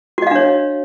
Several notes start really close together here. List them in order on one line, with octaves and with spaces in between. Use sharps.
F#4 D#5 F5 D4 C#5